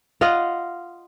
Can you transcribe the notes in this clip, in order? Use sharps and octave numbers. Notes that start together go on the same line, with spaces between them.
F4 D#5 F5 F#5